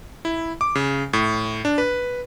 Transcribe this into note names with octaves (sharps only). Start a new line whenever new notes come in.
E4
D6
C#3
A2
D4
B4